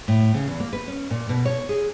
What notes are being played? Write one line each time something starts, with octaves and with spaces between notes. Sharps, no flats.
A2
C#3
E2
A#3
B4
C#4
A#2
B2
C#5
G#4